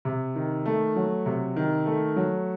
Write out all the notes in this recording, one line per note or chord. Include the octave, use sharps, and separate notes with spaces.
C3
D#3
A3
F#3
C3
D#3
A3
F#3